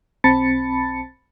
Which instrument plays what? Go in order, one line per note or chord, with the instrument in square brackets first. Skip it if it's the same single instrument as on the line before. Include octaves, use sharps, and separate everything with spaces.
[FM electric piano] B1 C4 A5 B5 A6 C#7